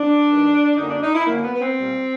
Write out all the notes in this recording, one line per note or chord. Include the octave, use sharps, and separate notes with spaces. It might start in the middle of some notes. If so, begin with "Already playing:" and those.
Already playing: D4
G2 D#3 G#3
F#2 D3 F#3 A#3 D#4
D4
D#4
E4
F#2 D3 F#3 A#3
B3
B3
C4
A#2 G3 A#3